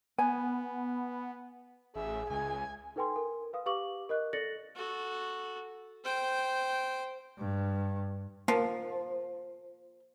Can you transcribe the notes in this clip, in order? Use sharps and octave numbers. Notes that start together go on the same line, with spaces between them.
B3 G#5
A1 G#4 E5
C#2 G#5
D#4 A4 B4 G5 G#5 C6
A#4
B4 F5 D#6
G4 B4 F5 C#6 D6 F#7
A#4 D#5 F#6
A4 D5 A6 A#6 C#7 F#7
F#4 A4
C5 G5
G2
F3 A#3